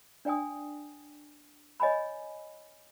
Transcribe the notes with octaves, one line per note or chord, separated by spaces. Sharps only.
D4 D5 G5 G#5 D#6
C#5 D#5 G#5 A#5 B5